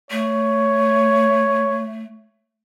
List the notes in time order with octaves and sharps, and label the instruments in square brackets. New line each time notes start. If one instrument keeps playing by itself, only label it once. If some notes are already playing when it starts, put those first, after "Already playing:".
[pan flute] A3 [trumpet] C#5